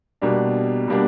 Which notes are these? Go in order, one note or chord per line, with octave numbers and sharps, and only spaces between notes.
B2 G3 A#3 D4
B2 G3 A#3 D4